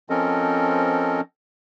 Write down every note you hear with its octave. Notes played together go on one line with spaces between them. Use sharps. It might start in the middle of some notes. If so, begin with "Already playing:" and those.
F3 C4 C#4 A4 A#4 D#5